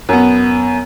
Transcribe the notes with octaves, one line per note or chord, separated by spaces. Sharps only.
F#2 B3